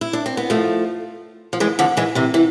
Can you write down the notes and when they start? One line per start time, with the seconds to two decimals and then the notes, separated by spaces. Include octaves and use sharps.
0.01 E4
0.13 D4
0.26 C4
0.37 B3
0.50 F3 A3
1.53 F3
1.60 E3 G#3
1.79 D3 F3
1.97 E3 G#3
2.15 C3 E3
2.34 E3